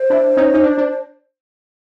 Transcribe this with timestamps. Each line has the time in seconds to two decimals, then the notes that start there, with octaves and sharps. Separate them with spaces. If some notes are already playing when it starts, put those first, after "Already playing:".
Already playing: C5
0.10 D4 E4
0.37 C#4 D#4
0.54 D#4
0.63 D4
0.78 D4